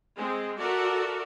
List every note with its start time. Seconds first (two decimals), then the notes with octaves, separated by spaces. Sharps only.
0.16 G#3 C4
0.58 F#4 A4 A#4 D5 E5